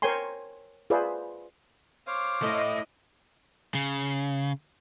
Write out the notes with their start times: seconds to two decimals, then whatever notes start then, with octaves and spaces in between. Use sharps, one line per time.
0.02 A#4 C5 C#5 G5 G#5 C6
0.90 F4 G#4 B4 C5 D5 E5
2.07 C5 C#5 F5 D6
2.42 A3 E4 D#5
3.75 C#3